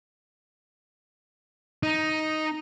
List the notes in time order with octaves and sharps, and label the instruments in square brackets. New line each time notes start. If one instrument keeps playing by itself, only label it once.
[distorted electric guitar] D#4